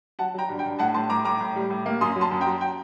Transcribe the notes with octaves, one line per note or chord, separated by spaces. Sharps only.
F#3 F#5 A5
F#3 G5 A#5
G2
G5
G2
A2 F#5 A5
A2 A5 C6
A2 A#5 D6
A2 A#5 D6
A2
G3
A2
A#3
F#2 C6 D#6
F#3
A5 C6
F#2
G5 A#5
F#3
G5